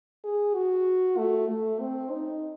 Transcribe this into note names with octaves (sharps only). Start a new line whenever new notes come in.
G#4
F#4
A3
A3
C4
D#4